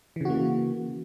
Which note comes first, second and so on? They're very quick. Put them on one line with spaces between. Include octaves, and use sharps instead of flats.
E3 C#3 F#4 A#3